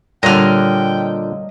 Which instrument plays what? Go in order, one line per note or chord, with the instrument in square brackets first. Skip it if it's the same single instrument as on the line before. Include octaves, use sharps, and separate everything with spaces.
[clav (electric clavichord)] A#2 D3 [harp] G3 C#5 F#5 [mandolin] D#5 F6 [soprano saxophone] G5